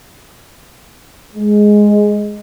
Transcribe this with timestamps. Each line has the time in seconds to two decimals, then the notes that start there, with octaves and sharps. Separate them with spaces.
1.35 G#3